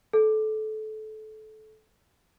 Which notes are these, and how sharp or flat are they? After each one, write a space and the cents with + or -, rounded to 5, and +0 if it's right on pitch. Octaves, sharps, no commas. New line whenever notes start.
A4 -25